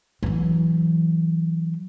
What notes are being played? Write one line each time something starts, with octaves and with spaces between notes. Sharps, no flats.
E3 F#3